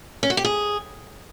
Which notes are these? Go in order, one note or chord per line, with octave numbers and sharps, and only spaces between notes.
C#4
F#4
G4
G#4